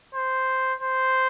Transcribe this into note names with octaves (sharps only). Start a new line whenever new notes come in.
C5
C5